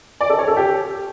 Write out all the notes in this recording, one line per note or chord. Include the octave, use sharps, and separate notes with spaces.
D5
A4
C#5
A4
G4